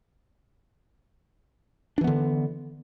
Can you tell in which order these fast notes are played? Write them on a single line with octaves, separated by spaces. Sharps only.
D4 E3 B3 D3